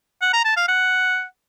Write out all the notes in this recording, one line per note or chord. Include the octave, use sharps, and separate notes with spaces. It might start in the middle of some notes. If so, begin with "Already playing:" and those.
F#5
A#5
A5
F5
F#5